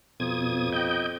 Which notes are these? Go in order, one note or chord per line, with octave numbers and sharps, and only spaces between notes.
F2 B2 D#6 G#6
D#5 G5 G6